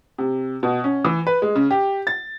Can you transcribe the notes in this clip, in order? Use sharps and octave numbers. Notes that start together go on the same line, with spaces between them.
C3
B2
C#4
E3
B4
G#3
C#3
G4
A6